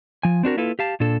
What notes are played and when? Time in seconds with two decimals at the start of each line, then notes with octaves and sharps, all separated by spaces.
0.23 F3 G#5
0.43 C4 D4 F#4 A#4
0.57 A#3 E4 F4 A4 B4
0.79 G4 F5 A5
1.00 A#2 D4 A4